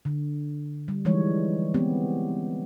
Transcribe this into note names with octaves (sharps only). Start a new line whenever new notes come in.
D3
G3
E3 F3 G3 G#3 D#4 C#5
G#3 B3 C4 G4